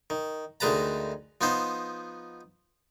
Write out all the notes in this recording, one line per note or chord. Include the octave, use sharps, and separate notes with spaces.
D#3
D2 D#3 G#3 B4 A5 A#5
F3 B3 D#4 C5